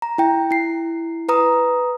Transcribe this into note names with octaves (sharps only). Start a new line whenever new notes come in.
A#5
E4 G5
E4 C7
B4 A#5 D#6